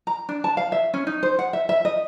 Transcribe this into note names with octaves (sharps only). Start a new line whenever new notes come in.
A#5
D4
A5
F5
E5
C#4
D#4
C5
F#5
E5
E5
D#5